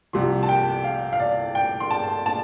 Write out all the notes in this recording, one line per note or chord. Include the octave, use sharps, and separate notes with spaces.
C2 C3 F3 C6
A5
G5
F5
F5
D5
G5
C6
A5
A5